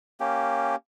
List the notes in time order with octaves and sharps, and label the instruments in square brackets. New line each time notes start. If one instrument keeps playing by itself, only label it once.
[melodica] A#3 C#4 G4